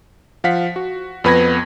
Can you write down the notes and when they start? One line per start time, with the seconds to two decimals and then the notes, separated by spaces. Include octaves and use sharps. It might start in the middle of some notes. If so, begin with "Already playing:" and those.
0.44 F3 F5 F#5 B6
0.76 F#4
1.24 F2 B3 B4 B5 G#6 A#6